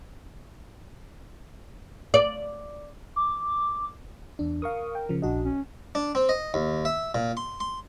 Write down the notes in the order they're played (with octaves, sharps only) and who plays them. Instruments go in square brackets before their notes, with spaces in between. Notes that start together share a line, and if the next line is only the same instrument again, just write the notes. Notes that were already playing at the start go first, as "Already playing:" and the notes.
[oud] D5
[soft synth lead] D6
[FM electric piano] E2 D4
[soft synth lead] A#4 [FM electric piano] F5 C#6 D#6
[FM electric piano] G5
C#3 F3
[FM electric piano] A#1 F#4 D#5 [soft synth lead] D4
[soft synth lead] C#4
[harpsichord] D4
C4
D#5
D#2
E5
A#2
C6
C6